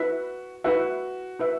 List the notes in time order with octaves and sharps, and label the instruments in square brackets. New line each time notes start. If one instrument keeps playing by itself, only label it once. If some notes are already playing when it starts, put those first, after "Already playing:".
Already playing: [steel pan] E4 B4 E5 [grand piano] F#4
[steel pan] E4 B4 E5 [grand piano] F#4
[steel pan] E4 B4 E5